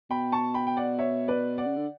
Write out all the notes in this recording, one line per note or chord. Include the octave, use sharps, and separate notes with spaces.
B2 G5 B5
A5 C#6
G5 B5
G5
D5 F#5
C#5 E5
B4 D5
D5 F#5
C#3
D3